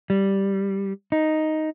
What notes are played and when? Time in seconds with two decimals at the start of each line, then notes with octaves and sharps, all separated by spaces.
0.10 G3
1.12 D#4